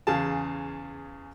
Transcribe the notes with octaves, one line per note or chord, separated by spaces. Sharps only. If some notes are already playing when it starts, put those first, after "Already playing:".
E2 C#3 G#4 F5 A5